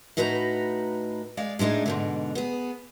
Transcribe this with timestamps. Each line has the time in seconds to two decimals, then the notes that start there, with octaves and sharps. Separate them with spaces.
0.17 A2 D#4 F#4 B4 C5 A#5
1.37 G#3 D5 F5
1.59 A2 G#3 D4 D#4
1.86 G#2 B2 D3
2.35 B3 G#4